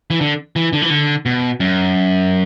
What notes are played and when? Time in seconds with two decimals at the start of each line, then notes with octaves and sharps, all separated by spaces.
0.10 E3
0.21 D3
0.56 E3
0.73 D3
0.82 E3
0.90 D3
1.26 B2
1.60 F#2